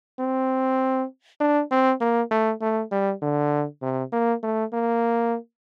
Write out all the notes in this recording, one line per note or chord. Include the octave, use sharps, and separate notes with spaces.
C4
D4
C4
A#3
A3
A3
G3
D3
C3
A#3
A3
A#3